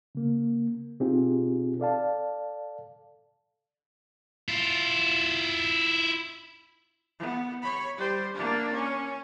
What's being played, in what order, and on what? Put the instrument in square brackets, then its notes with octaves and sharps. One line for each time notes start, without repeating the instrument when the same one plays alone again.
[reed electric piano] C#3 A#3
B2 C4 D#4 F4 G4 G#4
A4 D5 F5 A5
[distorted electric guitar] E4 F4
[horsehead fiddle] B3
C#5 B5
G3 C5
A#3 D4
C#4